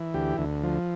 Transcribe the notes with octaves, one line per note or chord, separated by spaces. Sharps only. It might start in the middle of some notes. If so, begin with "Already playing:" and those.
Already playing: E3
D2 G4
D2
F3